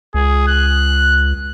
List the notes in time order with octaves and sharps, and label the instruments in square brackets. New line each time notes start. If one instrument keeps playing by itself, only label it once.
[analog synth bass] C#2 [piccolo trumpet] G#4
[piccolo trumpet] F#6